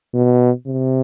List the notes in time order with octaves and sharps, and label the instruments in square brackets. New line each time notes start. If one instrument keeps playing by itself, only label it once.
[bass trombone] B2
C3